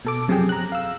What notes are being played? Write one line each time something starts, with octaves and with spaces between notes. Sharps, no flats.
B2 A4 D6
F#2 C3 F3 F#3 G#4 G5
A#5 F#6
F5 E6